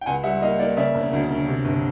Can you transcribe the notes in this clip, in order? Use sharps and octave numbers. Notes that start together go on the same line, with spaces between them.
G5
C#2 F#5 G#5
G3 E5 F#5
A#3 D#5 F5
A#3 D5
C#3 D5 E5
E1
D2
C#3
C3
G1